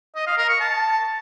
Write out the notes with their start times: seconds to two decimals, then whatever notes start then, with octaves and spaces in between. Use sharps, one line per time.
0.16 D#5
0.27 F5
0.38 A#4
0.49 C#6
0.60 A5